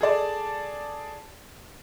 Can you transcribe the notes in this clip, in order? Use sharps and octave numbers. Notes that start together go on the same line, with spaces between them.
G#4 A4 D5 A5